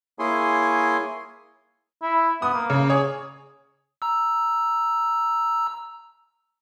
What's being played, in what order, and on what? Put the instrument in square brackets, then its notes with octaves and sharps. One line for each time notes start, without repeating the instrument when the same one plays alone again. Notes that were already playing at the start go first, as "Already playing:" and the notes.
[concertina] A#3 E4 G#4 C#5 G#5 C6
[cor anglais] E4
[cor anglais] B3 [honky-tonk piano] D#6
[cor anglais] A#3
[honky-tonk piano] C#3
[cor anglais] G#4 [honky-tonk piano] C#5
[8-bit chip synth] A#5 E6